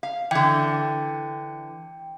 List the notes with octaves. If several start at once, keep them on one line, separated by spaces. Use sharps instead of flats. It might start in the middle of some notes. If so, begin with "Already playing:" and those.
F5
D3 E3 G5